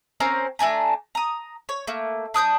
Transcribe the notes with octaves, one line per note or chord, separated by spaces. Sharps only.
C4 C#4 A#4 C5
A3 D4 G#5 A#5
A#5 D#6
C#5
A3 A#3
D4 D#6 F#6 G6